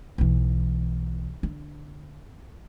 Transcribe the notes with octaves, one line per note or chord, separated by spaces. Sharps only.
B1 E3
D3